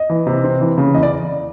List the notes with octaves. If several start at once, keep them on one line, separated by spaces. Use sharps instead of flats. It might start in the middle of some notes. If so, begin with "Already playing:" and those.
Already playing: D#5
E3
C3
C4
E3
C#3
E2 D#5
D5